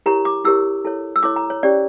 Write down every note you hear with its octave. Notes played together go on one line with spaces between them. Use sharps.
E4 G4 A#4 C#5 A#5
D6
E4 G4 A#4 C#5 E6
E4 A4 C#5
E6
E4 A4 C#5 D6
A#5
C#5
C#4 G4 C#5 D5